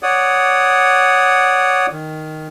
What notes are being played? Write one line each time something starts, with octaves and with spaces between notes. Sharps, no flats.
C#5 D5 F#5 D#6
D#3